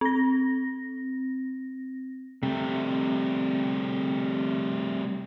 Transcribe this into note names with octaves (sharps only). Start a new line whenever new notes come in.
C4 A#6
C3 G3 A3